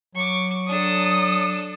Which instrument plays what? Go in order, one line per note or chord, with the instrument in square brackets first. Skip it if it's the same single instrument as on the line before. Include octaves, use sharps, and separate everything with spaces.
[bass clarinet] F#3 [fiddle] C#6 D6
[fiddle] D4 A4 [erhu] D#6